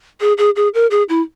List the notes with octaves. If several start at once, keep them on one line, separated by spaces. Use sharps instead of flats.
G#4
G#4
G#4
A#4
G#4
E4